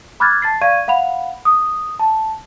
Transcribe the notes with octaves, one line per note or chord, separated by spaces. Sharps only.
B5 D6 F6 F#6 G#6 A6
A5 A6 C7
D5 F5 C#6 G#6 D#7
F5 F#5 B5 F7
D#6
A5